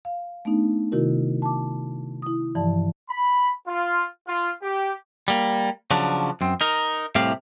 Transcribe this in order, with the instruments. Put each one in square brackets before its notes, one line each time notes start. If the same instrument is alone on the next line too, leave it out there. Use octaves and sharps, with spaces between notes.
[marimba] F5
A3 B3 D4 D#4
C3 D#3 E4 F#4 A#4
A5 D6
E4 D#6
G2 E3 F3 D5 A5
[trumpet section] B5
F4
F4
G4
[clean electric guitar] G3 A#3
C#3 F3 F#3 D4
F#2 C4
D#4 A#4
C2 A2 C3 G4 F5